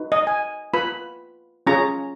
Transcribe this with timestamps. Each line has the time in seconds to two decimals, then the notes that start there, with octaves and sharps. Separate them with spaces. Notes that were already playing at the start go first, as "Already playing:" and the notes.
Already playing: D#4 F#4 B4
0.12 D#5
0.27 G#5
0.74 F4 B4 B5
1.67 C#4 F4 G#4 C#5 A#5